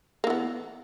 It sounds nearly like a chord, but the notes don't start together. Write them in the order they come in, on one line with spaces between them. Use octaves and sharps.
A#3 E3 B3